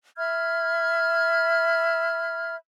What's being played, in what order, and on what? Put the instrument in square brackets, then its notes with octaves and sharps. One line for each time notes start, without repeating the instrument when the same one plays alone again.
[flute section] E5 B5 F6 G#6